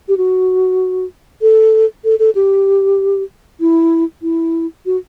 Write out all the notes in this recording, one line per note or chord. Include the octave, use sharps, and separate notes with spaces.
G4
F#4
A4
A4
A4
G4
E4
E4
F#4